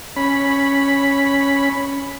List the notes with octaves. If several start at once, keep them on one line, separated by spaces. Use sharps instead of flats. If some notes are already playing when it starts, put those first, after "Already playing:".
C#4 B5